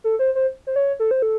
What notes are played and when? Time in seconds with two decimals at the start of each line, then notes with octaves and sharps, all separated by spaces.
0.04 A4
0.19 C5
0.35 C5
0.67 C5
0.76 C#5
1.00 A4
1.11 C5
1.22 A4